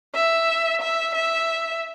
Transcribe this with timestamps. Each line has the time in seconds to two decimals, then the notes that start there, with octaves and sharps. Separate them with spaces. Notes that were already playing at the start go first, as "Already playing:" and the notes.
0.15 E5
0.81 E5
1.14 E5